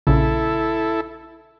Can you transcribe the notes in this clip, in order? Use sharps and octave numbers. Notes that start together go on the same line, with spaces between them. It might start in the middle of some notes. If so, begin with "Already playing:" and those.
A#1 C#3 E4 A4